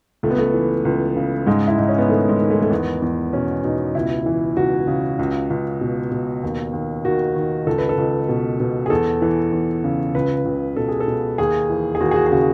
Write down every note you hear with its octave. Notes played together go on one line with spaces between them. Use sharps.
C#2 A3
B3
A3
E3
C#2
C#3
G#2 G#3
E4
G#2 D#4
C#4
B3
D#3 A3
G#3
D#3
A3
A3
E2 B3
E2
B2 C#4
B2 D#4
C#2 E4
E3
C#2 F#4
C#3
C#2
C#2
B2
B2
D#2
D#2
D#3 F#4
D#3
C#2 A4
B4
A4
C#2
B2
B2
G#4
E2 A4
E3
E2
C#3
C#2 B4
C#2
B2 A4
G#4
A4
B2
D#2 G#4
E3
G#4
D#2 F#4
G#4
F#4
G#4
C#3 F#4